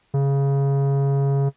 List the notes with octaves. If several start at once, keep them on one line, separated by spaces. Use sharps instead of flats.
C#3